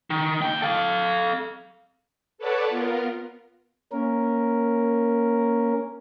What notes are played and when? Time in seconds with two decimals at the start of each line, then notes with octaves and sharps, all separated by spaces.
0.10 D#3
0.42 D#2 G5
0.62 A4 F5
2.38 A4 B4 C#5 D5 F#5 A5
2.69 B3 F4 A#4
3.92 A#3 C#4 A#4